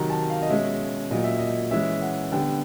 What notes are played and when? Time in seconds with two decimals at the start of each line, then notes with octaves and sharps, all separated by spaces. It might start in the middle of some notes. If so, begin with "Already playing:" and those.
Already playing: C3 D#3 F#3 A#5
0.10 A5
0.30 F5
0.42 D#5
0.49 B2 G#3 C#4 E5
1.11 A#2 F#3 A#3 D#5
1.24 E5
1.39 D#5
1.71 E3 G#3 C#4 E5
2.02 F#5
2.32 D3 G3 B3 G5